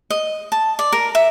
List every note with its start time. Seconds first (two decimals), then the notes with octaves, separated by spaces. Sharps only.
0.10 D#5
0.52 A5
0.79 D5
0.92 A#4
1.15 E5